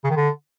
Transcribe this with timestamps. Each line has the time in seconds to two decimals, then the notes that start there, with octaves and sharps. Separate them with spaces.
0.04 C#3
0.10 D#3
0.16 D3